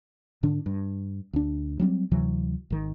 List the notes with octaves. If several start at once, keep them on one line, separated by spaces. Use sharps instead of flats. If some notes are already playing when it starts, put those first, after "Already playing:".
G#2 D3 D4
G2
D2 D4
F#3 G3 B3 C4
D2 C3 E3 F#3
G#1 D#3